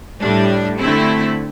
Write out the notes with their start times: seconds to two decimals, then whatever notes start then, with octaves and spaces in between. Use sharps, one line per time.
0.21 A2 G3 D4
0.79 D3 A3 C4 E4